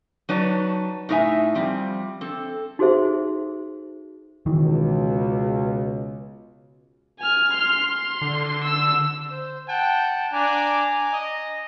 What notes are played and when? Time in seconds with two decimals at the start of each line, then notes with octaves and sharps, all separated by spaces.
0.29 F#3 D#4 B4 C#5 D5 A5
1.09 A2 D#4 A#4 D5 E5 G#5
1.55 F3 G3 C4
2.21 C4 A4
2.79 D#4 F#4 G#4 A4 C5 E5
4.46 C#2 B2 D#3 E3
7.19 G#5 F6
7.53 C6 F6
7.92 C6
8.22 D3
8.64 E6
9.31 C5
9.68 F#5 G5 A5
10.33 D4 G#5 A#5 D6
11.13 D#5